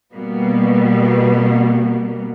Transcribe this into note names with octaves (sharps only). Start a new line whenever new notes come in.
B2 G3 A#3 B3